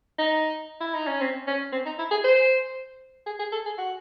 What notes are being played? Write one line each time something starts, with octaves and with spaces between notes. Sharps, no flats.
D#4
E4
D#4
C#4
C4
C#4
C4
D#4
E4
G#4
C5
G#4
G#4
A4
G#4
F#4